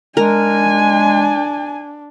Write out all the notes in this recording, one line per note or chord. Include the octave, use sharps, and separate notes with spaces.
G#3 D4 A#4 G#5